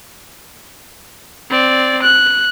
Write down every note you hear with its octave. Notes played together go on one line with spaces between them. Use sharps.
C4 D5
F#6